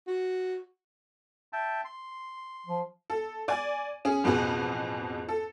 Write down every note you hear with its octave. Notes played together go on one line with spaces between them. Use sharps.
F#4
E5 G5 A5
C6
F3
A4
D5 G#5
C#4 G#4
A1 F2 B2 G#4 B4
A4